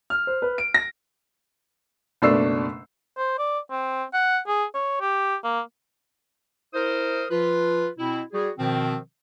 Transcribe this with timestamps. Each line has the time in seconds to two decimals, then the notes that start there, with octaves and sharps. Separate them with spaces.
0.10 F6
0.27 C5
0.42 B4
0.58 D7
0.74 A#6
2.22 F#1 B2 A3 D4 E6 C7
3.18 C5
3.38 D5
3.71 C4
4.13 F#5
4.47 G#4
4.74 C#5
5.01 G4
5.44 A#3
6.74 E4 A#4 C5 D#6
7.30 F3 F4 B4
7.98 B2 C4 E4
8.33 G3 F#4 G#4
8.59 B2 D#3 F3 C4